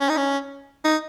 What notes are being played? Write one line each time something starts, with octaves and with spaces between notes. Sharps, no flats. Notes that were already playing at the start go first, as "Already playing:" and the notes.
C#4
D#4
C#4
D#4